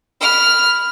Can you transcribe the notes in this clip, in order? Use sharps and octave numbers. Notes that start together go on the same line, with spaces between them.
B5 F6